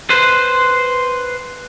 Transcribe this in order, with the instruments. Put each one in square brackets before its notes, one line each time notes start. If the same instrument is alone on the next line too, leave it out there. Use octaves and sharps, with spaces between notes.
[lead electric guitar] B4 C5